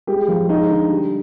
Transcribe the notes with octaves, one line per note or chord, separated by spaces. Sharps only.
G#3 G4
F3
G#3 D#4
D3
G3